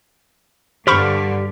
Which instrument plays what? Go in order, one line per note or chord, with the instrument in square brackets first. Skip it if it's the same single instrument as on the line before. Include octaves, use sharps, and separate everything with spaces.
[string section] G2 D3 [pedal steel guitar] G4 F6 [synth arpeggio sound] C5 B5 C#6